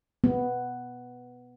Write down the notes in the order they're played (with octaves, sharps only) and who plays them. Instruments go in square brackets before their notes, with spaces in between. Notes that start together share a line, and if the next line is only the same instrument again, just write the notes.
[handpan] B3